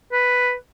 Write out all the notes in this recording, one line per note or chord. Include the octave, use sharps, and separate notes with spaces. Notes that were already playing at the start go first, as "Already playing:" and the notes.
B4